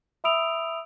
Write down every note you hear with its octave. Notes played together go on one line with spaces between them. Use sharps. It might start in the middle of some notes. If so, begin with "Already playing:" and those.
E5 B5 D#6 E6 D7 F7